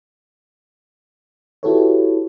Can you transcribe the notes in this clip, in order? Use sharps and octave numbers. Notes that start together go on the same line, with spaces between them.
E4 F#4 G4 A4 B4 C#5